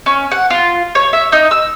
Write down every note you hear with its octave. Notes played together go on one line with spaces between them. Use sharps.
C#4
F#5
F4
C#5
E5
D#4
E6